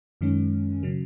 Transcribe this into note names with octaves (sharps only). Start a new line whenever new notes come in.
F#2 D#3 G#3 C#4
C#3 F#3